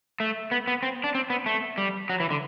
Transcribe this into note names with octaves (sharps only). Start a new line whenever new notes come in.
A3
B3
B3
C4
D4
C4
B3
A3
G3
F#3
E3
D3